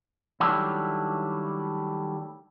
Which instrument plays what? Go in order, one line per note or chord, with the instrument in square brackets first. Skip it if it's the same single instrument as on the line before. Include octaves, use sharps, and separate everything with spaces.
[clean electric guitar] D#3 F#3 G3 A3 D4 E4